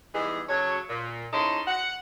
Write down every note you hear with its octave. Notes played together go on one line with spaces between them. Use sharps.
E3 G3 G#3 B3 D#4 G#4
C#3 F#3 F#4 A4 C#5
A#2
G#2 C#4 D#4 E4 A5 C6
F#5